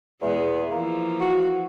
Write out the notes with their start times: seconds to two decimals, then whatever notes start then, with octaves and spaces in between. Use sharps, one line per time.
0.22 E2 B2 G#3 B3
0.71 E3 F3 A#3
1.21 F#4